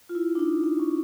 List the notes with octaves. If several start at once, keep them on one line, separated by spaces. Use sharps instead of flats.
F4
E4
D4
D#4
D#4
C#4